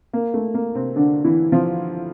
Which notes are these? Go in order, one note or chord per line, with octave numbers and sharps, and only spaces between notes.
A#3
A3
A#3
C3 C4
D3 D4
E3 E4
F3 F4